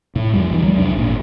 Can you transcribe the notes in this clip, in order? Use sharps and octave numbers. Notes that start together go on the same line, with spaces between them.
A2
F2 G3
B1 D#3 E3
F#3 G#3
C2 F2 D4
G#1 A#2